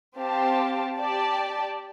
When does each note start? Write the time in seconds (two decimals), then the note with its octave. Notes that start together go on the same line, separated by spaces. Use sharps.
0.17 C4 G4 C5 F5 A5
0.98 G4 D5 A5